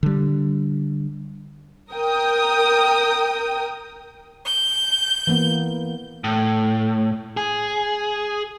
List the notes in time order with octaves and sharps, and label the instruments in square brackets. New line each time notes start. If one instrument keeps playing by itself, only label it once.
[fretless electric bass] D3 G3
[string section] A#4 G5 D#6
[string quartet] G6
[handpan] E3 A#3 B3
[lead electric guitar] A2
G#4